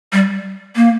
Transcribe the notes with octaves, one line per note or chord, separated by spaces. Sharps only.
G3
A#3